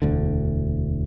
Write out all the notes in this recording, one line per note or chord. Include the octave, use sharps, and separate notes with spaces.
E1 D2 D3